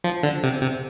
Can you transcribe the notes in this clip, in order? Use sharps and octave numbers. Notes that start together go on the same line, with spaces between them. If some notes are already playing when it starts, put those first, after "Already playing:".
F3
D3
C3
C3